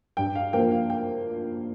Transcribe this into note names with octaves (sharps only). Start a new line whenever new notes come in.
G2 G5
F5
F3 A#3 G5
F5
G5